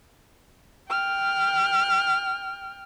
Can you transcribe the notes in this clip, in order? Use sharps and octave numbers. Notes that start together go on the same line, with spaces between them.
G5 F6